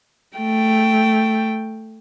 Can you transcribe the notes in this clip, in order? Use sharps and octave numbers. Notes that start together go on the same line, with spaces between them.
A3 G5